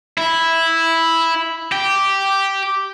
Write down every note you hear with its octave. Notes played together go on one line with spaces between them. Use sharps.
E4
G4